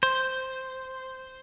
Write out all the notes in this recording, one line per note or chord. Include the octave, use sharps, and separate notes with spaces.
C5